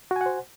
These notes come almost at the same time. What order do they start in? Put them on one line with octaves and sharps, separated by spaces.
F#4 G#5 F#5 C5